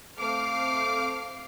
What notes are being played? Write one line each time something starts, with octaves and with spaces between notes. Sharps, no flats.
A3 C4 F5 D6 F6 C7